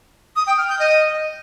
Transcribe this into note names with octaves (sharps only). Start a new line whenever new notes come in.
D#6
G5
F6
G6
D#5